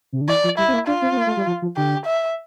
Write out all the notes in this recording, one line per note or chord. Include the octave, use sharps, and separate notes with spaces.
C3
D3
E3 D5
F3
G3 E4
C4
A#3
D4 F4
C4
C4
A#3
A3
G3
F3
F3
D3 G4
E5